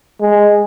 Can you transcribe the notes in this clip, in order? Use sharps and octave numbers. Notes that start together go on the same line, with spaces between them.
G#3